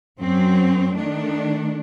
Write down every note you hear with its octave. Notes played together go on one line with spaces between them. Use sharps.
F#2 F#3 C4
D#3 A3 D4